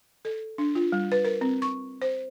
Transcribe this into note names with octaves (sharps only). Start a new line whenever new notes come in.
A4
D4
F4
G3
B4
A#4
C4
C#6
C5